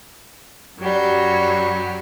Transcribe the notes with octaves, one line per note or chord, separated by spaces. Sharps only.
F#2 F#3 G3